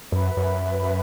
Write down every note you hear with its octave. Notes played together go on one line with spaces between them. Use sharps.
F#2 B4 E5 B5
F#2